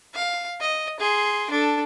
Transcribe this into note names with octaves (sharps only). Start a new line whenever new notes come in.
F5
D#5
G#4 C6
D4 A4